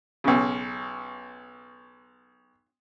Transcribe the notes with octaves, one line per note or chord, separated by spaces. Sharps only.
B1 C#3